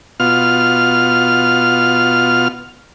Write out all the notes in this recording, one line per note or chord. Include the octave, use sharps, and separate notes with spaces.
B2 F4 F6